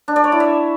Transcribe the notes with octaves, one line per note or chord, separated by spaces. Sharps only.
D4
D5
C#5
E4
E5